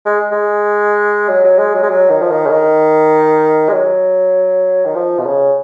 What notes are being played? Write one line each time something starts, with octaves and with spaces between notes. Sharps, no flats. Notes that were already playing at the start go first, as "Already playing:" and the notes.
G#3
G#3
F#3
F#3
G#3
F#3
G#3
F#3
D#3
F3
D#3
C#3
D#3
G#3
F#3
D#3
F3
B2
C#3